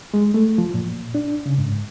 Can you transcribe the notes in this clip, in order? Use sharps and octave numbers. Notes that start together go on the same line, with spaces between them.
G#3
A3
F3
A#2
D4
C#3
G#2